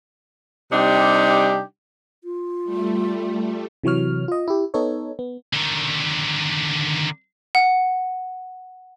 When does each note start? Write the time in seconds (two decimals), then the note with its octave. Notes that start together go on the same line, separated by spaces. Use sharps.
0.72 C3 G3 D4 D#4 G4
2.24 F4
2.64 G3 A3
3.84 C3 E3 F#3 C#5 F6
4.28 F4 D#5
4.48 E4 G4
4.74 B3 D#4 A4 C#5
5.19 B3
5.53 D3 D#3
7.55 F#5